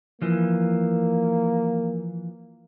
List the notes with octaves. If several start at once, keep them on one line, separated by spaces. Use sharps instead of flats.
E3 F3 A#3